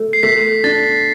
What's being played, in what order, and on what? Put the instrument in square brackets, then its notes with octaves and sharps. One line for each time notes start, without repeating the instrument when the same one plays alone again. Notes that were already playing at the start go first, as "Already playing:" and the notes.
Already playing: [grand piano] A3
[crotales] C7
[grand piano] A3 [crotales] B6
[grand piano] D4 [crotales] A6